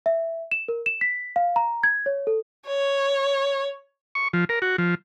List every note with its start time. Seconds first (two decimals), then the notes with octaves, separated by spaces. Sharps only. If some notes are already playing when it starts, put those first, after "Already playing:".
0.06 E5
0.51 E7
0.68 A#4
0.86 E7
1.01 B6
1.36 F5
1.56 A#5
1.83 G#6
2.06 C#5
2.27 A4
2.66 C#5
4.15 C#6
4.33 F3
4.49 A#4
4.62 F#4
4.78 F3